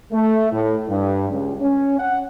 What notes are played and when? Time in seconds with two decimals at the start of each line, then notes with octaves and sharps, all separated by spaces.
0.12 A3
0.51 A2
0.87 G2
1.29 C#2
1.60 C#4
1.98 F#5